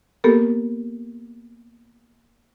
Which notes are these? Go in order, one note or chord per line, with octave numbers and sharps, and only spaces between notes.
A#3 B3 G4 A4 A#4